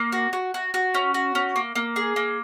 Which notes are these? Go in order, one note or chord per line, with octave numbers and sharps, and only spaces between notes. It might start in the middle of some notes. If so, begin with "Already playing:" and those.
Already playing: A#3
F#4
F#4
F#4
F#4
C#4
F#4
C#4
A#3
A#3
G#4
A#3